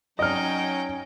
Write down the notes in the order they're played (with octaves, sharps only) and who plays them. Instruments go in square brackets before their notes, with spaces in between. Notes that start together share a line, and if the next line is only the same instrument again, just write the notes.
[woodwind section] F#3 [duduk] C#4 [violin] D#4 G5 [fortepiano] D#5 F6